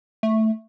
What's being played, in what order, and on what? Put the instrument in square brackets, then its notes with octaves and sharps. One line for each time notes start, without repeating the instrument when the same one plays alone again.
[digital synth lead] A3